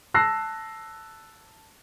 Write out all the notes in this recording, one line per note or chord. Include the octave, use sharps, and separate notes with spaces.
A5 E6 F#6 A#6 C7